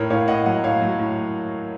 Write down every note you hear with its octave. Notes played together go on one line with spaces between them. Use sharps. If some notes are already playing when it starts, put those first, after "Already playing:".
Already playing: A2 A#4 C#5
A2 C#5 F5
A2 D#5 F#5
F#3 D#5 F#5
A2 C#5 F5
F#3
A2